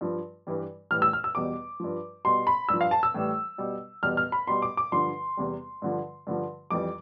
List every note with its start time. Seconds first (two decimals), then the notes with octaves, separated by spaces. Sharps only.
0.01 G2 F3
0.47 G2 E3 G3
0.91 A2 E3 G3 F6
1.02 E6
1.13 F6
1.24 E6
1.35 E2 B2 G3 D6
1.80 G2 F3
2.25 B2 G3 C6
2.47 B5
2.69 G2 F3 E6
2.81 F5
2.91 A5
3.03 E6
3.14 A2 E3 G3
3.58 B2 G3
4.03 E2 B2 G3 F6
4.17 F6
4.32 B5
4.47 B2 G3 C6
4.62 D6
4.77 D6
4.92 G2 D3 F3 C6
5.37 E2 C3 G3
5.82 G2 D3 F3
6.27 G2 D3 F3
6.70 F2 E3 G3 D6